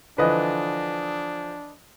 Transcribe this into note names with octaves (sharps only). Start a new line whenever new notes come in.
D3 E3 F3 D4 B4 D#5